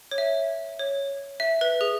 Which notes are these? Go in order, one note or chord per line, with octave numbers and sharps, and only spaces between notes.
C#5
E5
C#5
E5
B4
G#4